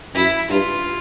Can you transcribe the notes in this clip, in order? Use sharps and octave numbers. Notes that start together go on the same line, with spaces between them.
F#2 E4
G2 F4